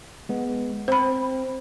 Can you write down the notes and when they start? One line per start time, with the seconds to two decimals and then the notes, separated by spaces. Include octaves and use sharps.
0.29 G#3 B3
0.88 C4 C5 B5